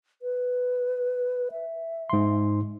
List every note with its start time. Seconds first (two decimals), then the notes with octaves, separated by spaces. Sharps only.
0.22 B4
1.52 E5
2.10 G#2 C6